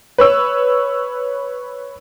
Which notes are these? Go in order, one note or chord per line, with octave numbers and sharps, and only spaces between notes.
B4 C#5 E6